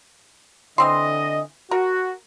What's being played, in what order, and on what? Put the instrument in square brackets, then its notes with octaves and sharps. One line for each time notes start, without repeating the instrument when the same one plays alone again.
[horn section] D3 D#5 [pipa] E3 C4 C6
[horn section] F#4 [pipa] A#4